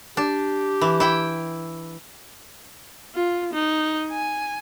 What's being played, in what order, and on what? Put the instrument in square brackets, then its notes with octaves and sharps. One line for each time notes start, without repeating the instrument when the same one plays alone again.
[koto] D4 [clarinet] G4
[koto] E3
E4 G5
[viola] F4
D#4
G#5